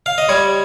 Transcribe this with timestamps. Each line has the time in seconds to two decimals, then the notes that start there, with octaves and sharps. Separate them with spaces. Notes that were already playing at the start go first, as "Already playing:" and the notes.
0.06 F5
0.18 D#5
0.29 G3 C#5